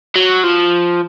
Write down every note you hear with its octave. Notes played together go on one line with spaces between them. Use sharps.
F#3
F3